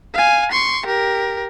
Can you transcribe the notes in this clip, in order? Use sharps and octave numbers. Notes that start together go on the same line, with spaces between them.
F5 G#5
C6 C#6
G4 A#4